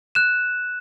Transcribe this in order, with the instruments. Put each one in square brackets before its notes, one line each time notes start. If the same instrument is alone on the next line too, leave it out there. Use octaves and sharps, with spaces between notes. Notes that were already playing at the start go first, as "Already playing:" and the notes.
[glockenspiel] F#6 E7